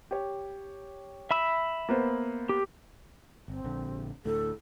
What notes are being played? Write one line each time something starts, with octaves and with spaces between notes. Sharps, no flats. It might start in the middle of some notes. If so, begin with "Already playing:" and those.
G4 C#5
E5 B5 E6
A#3 B3 C5
G4
G1 C4
A#1 D3
D2 A2 A4